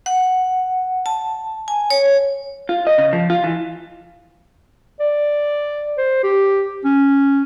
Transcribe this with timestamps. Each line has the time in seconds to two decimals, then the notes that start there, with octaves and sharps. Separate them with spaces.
0.06 F#5
1.06 A5
1.68 G#5
1.90 C#5
2.69 F4
2.87 D#5
2.98 C#3
3.13 F3
3.30 F4
3.44 E3
5.00 D5
5.98 C5
6.23 G4
6.85 C#4